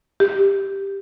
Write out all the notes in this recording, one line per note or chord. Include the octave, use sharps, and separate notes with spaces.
G4